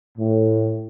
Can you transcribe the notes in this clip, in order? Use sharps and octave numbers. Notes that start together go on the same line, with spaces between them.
A2